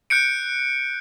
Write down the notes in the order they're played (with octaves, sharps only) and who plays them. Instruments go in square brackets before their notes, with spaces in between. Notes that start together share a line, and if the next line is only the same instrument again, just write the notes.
[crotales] F#6 G6 C#7 D7